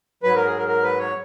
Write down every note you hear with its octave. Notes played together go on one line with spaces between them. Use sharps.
G#2 F#3 B4
A#4
G#4
A#4
A#4
B4
C#5